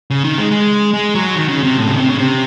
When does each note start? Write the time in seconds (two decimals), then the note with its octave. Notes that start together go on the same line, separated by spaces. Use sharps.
0.10 C#3
0.24 D#3
0.38 G#3
0.51 G#3
0.94 G#3
1.15 F#3
1.36 D#3
1.48 C#3
1.63 C3
1.77 A2
1.88 C#3
1.97 C3
2.09 C#3
2.19 C3